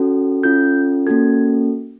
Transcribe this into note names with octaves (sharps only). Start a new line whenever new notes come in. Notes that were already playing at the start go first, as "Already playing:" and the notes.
Already playing: C#4 F#4 A4
C#4 F4 A4 G6
A#3 C#4 F#4 A4 G#6